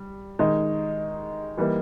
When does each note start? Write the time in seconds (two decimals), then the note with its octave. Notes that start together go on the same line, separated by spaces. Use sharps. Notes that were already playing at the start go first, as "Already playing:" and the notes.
Already playing: G3
0.39 D#3 G#3 D#4
1.57 E3 G3 A#3 D#4